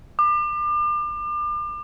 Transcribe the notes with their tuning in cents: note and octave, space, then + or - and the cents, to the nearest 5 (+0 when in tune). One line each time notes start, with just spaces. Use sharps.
D6 +35